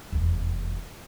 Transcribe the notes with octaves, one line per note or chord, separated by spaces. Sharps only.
F1 E2